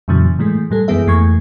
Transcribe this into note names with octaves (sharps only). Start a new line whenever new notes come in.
F2 A#2 C#3 E3 F#3
A2 E3 G#3 A3
A2 G3 A4
F#2 E3 G#3 B3 G#4 E5
F2 E3 A3 A#3 C#6 G#6